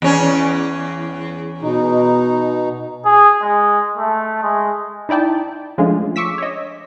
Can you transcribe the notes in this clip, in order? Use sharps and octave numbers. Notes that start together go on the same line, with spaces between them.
E2 C#4
B2 D#4
G#4
G#3
A3
G#3
D#4 E4 D5 G5 A5
F3 G#3 A3 C#4 D4 F4
C#6 D6 E6 B6
C#5 D#5